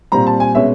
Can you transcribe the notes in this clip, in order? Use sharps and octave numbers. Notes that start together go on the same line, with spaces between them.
A#2 G3 C4 A#5
A5
G#5
B2 G#3 C#4 E5